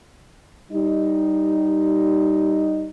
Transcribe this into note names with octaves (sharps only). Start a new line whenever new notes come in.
G3 D#4